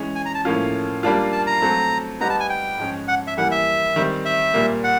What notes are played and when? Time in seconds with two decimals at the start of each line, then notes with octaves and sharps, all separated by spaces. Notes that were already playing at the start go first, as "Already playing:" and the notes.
Already playing: E3 G#3 C#4
0.15 G#5
0.25 A#5
0.34 A5
0.45 A2 F3 A#3 C#4 F4
1.03 G3 A#3 D4 F4
1.32 A5
1.47 A#5
1.62 F#3 A3 C4
2.20 G3 B3 D#4 G4 A#5
2.29 A5
2.40 G#5
2.49 G5
2.78 G#2 F3 G#3 C#4
3.08 F#5
3.27 E5
3.37 E3 G3 A#3 F#5
3.51 E5
3.96 D#3 G3 C4
4.25 E5
4.54 A#2 G3 A#3
4.84 F#5